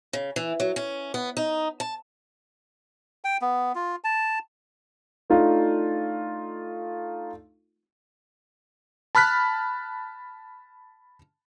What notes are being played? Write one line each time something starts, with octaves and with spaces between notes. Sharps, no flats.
C#3
E3
F#3
C#4
B3
D#4
A5
G5
B3
F4
A5
A3 D4 D#4 F4
A5 B5 F6 F#6 B6